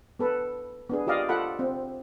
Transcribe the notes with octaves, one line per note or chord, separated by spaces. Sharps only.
B3 A4 B4
B3 D4 G#4
F4 G4 D5 D#5 F5
F4 A4 F#5 B5
C4